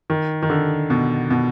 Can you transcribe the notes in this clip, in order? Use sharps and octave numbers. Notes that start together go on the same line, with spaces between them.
D#3
D#3
D3
B2
B2